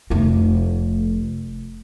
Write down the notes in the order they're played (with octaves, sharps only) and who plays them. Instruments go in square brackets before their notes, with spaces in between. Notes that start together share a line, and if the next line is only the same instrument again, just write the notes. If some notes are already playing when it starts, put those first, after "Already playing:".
[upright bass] F1 A3